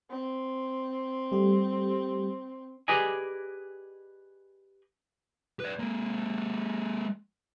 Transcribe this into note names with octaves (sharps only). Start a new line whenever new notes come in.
C4
G3 A3 G4
G4 G#4 B4 D5 D#5 G#5
B4 D5
G#3 A#3